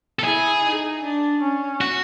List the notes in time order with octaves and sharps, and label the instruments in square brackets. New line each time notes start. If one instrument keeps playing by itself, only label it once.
[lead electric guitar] A4
[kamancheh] E4 [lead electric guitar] G#4
[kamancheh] D#4
D4
C#4
[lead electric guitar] F#4